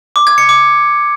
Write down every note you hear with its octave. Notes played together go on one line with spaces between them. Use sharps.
D6
G#6
C#7
D6